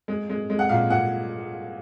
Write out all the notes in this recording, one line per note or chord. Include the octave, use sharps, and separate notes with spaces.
G#3
G#3
G#3
F#5
A#2 F5
A#2 F#5